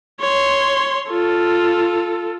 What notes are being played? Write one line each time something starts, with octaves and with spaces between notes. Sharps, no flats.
C#5 C6
F4 A4